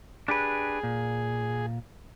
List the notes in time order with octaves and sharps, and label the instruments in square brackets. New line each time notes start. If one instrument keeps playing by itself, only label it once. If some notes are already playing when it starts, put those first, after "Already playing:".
[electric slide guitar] D4 G4 B4 [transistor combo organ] G#4
[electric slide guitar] A#2